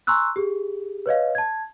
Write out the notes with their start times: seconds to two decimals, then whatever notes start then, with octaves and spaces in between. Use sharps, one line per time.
0.07 G#5 A#5 C6 C#6 E6 F#6
0.36 G4 G#4
1.06 B4 C#5 D#5 F5
1.35 A5 G#6